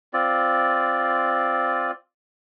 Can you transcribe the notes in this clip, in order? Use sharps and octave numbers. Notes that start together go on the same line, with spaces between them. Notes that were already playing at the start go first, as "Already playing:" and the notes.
C4 F4 D5